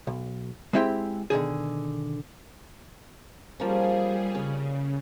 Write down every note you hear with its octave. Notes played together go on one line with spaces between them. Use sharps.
B1
G#3 C4 E4 G4 F5 G5
B2 D3 D#3 G#4
F3 G3 A#3 C#4 G#4
C#3 C#4